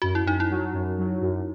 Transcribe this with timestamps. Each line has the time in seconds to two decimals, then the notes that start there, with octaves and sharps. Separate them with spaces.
0.02 F#2 F#4
0.15 E4
0.25 F#2 D#4
0.40 E4
0.50 F#3
0.73 F#2
0.98 F#3
1.21 F#2